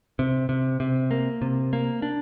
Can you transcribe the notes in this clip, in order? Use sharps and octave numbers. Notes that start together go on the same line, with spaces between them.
C3
C3
C3
A#3
C3
A#3
D4